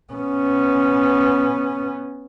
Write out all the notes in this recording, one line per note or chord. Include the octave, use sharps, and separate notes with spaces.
B3 C#4